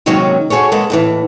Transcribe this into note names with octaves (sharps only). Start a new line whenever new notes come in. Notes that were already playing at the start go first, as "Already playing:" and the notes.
C3 D#3 F#3 G#3 A#3 C#4
F#4 G#4 A4 C#5
G#3 A#3 B3 A4
D#2 A2 E3